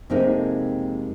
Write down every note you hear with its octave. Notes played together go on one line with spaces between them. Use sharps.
F2 C3 G#3 A#3 C4 D#4